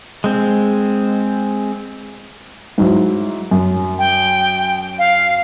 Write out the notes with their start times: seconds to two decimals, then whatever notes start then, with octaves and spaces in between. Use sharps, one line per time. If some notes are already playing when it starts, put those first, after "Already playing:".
0.24 G#3 C4
2.78 G#2 F#3 E4
3.51 F#2
3.99 G5
4.98 F5